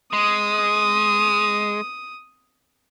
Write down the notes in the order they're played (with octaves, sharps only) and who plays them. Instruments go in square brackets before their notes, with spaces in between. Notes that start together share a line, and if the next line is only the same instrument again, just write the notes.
[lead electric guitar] G#3 [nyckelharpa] D#6